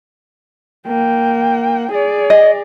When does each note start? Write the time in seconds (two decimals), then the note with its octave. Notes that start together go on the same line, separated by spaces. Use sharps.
0.87 A#3 G5
1.92 G#4 D5
2.30 D#5